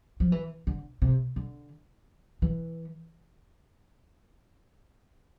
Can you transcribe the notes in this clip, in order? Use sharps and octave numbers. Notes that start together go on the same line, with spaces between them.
F3
E3
D3
C3
D3
E3